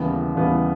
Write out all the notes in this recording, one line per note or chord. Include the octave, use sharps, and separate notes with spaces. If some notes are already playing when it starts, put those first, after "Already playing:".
Already playing: D#2 C#3 E3 G3 B3
D#2 C#3 E3 G3 B3